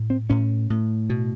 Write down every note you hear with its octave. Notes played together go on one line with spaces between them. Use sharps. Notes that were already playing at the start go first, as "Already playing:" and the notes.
Already playing: A2
C4
A2 C#4
A2
B2